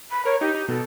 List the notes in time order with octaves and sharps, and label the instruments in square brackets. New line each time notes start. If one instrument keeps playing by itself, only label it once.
[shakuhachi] B5
[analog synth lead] A#4 [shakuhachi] C#5
[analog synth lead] D#4 [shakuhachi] G4
[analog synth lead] D#4
[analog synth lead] B2 [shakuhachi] A4